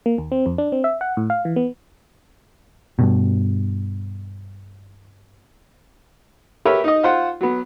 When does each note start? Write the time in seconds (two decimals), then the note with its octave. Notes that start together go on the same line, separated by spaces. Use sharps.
0.06 A#3
0.18 D#2
0.32 C4
0.46 F2
0.58 D4
0.72 C4
0.84 E5
1.01 F#5
1.17 A2
1.30 F5
1.45 E3
1.56 B3
2.99 G2 B2
6.65 G4 A#4 B4 C#5 E5
6.84 D#4 D#5
7.03 F4 C5 F#5
7.41 F#3 B3